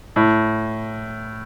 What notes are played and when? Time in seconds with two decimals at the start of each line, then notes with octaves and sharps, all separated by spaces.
0.16 A2